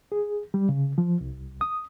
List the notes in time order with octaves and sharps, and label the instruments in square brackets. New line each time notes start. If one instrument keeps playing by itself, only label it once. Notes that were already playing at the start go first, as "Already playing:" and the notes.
[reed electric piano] G#4
G3
C#3
F3
C2
D#6